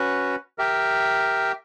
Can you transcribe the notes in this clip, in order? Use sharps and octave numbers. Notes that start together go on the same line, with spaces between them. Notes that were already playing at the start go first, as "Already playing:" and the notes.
Already playing: C#4 F#4 B4
G4 A#4 E5 G5